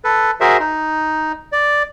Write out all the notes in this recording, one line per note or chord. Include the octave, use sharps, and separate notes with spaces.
A4 B4
F#4 G#4 A#4 C5 E5
D#4
D5